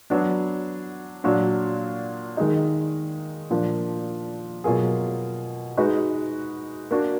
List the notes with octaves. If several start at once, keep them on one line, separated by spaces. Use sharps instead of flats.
F#3 B3 D4
A#2 F#3 D4 F#4
D#3 G#3 D#4
A#2 F3 A#3 D4
B2 F#3 A#3 F4 G#4
G#3 D#4 F#4 B4
A#3 D4 F#4